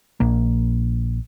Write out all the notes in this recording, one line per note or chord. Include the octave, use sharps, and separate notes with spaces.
A#1 A#3